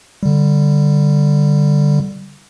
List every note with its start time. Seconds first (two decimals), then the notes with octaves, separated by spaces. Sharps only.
0.23 D3 G3